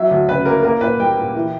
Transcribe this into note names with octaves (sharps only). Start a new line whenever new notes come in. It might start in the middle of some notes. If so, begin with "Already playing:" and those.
Already playing: F#3 E5
D2
C#3 B4
A#3 A#4
A#3 A#4
A#2 B4
G3 G5
A#2
E3